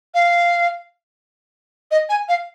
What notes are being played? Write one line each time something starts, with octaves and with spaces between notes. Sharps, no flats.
F5
D#5
G#5
F5